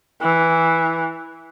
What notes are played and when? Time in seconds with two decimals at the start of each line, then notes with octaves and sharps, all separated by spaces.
0.22 E3